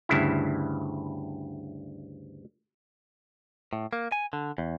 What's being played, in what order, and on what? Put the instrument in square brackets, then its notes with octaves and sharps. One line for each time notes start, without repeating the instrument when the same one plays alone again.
[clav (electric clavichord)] D2 G2 C#3 E4
[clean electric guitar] A2
A#3
G#5
D3
E2